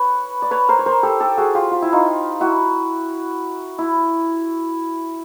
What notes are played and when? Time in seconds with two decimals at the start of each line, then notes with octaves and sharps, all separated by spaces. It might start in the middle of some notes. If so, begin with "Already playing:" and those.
Already playing: B4 C#5
0.42 D5
0.51 B4 C#5
0.69 A#4 C5
0.79 C#5
0.86 A#4 C5
1.03 G4 A4
1.20 G4 A4
1.37 F#4 G#4
1.55 F4 G4
1.71 F4
1.82 E4
1.92 D#4 F4
2.40 E4 F#4
3.78 E4